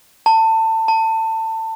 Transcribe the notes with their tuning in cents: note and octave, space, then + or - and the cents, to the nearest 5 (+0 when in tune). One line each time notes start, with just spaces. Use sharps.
A5 +25
A5 +25